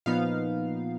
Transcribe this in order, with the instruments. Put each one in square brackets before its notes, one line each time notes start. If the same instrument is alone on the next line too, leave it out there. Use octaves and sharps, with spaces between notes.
[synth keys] A#2 F3 B3 D#4 F5